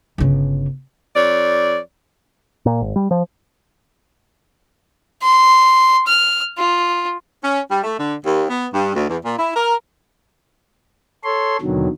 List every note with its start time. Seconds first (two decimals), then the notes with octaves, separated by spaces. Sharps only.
0.18 G1 C#3
1.16 F2 C#5 D5
2.66 A#2
2.81 G#1
2.96 G3
3.11 F3
5.23 C6
6.07 F6
6.58 F4
7.42 C#4
7.69 G3
7.83 A3
7.97 D3
8.24 D#2
8.48 B3
8.72 G2
8.94 D2
9.07 E2
9.22 A#2
9.37 E4
9.55 A#4
11.24 A4 C#5 C6
11.61 D#2 B2 D3 D#3 F#3